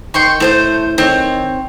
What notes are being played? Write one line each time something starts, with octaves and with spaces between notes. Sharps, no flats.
D#3 G5 C6 C#6
A2 A3 C5 G6
D#3 C4 C#5